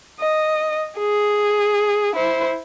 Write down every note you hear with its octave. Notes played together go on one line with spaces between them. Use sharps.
D#5
G#4
E4 C5